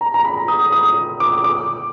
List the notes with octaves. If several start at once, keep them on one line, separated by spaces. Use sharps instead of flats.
A#5
A#5
B5
D#6
D#6
D6
D6